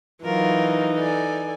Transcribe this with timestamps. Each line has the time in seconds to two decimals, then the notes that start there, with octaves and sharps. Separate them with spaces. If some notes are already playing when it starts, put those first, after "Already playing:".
0.25 E3 F#3 D#4 F4 A#4
0.96 A4 D5 G#5